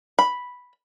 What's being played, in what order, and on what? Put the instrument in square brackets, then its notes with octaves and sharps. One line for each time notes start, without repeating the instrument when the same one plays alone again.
[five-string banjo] B5